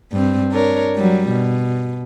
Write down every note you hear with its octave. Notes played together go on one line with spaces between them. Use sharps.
G2 C4
D4 A#4 C#5
F#3 G3
B2